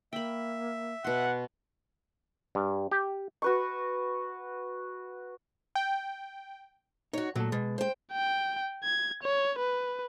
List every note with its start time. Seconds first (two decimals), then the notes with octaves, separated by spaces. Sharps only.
0.13 A#3 E5 G5 B5
1.04 B2 F#5 C6
2.55 G2
2.91 G4
3.42 F#4 B4 C#6
5.75 G5
7.13 D#4 F#4 C#5
7.36 A#2 F#3 A3 A4
7.52 B2 G#3
7.78 C5 G5
8.13 G5
8.84 G#6
9.23 C#5
9.59 B4